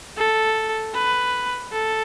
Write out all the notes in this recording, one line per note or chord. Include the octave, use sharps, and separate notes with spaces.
A4
B4
A4